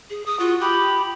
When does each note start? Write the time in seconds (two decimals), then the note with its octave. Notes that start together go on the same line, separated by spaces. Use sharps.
0.10 G#4
0.26 D#6
0.40 F4 F#4
0.61 G4 B5